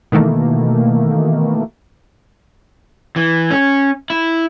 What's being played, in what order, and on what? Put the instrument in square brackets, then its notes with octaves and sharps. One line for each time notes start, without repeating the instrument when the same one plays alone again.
[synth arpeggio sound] B2 D#3 E3 A3 A#3
[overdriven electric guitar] E3
C#4
E4